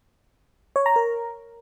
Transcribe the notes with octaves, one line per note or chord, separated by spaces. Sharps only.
C#5
A#5
A#4